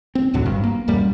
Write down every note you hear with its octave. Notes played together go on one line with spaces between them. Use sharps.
C4
D2 A2 D3 F#3
G#1 G2
A#3
D1 F#2 A#2 G3